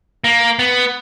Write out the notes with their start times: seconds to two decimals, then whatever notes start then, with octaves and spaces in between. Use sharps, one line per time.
0.24 A#3
0.59 B3